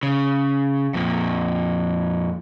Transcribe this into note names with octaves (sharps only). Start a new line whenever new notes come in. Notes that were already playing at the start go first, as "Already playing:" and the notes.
C#3
F2 A#2